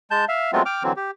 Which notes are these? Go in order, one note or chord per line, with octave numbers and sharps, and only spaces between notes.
G#3 A5 G6
E5 F5
F#3 G#3 A3 B3 C4 F4
G5 D6 F6
D3 E3 F#3 C4
G4